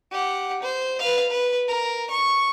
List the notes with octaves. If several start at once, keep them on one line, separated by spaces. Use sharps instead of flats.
G4 F#5
C5
B4 F5
B4
A#4
C#6